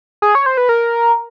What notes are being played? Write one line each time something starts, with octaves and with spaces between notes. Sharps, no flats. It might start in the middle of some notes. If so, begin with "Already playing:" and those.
G#4
C#5
C5
B4
A#4